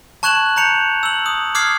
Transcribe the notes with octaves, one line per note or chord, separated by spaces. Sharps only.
A5 C#6 F#6 G#6 E7 F#7
A#5 G6 C#7 F7
E6 F#7
D#6
D6 D#6 F6 G#6 C7